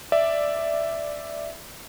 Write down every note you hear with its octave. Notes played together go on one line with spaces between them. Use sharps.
D5 E5